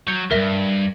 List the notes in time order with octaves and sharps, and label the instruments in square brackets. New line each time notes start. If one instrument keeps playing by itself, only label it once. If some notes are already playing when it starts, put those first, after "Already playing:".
[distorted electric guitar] F#3 [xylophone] G6 C#7
[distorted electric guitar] D2 G2 [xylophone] A#4 E5 A#6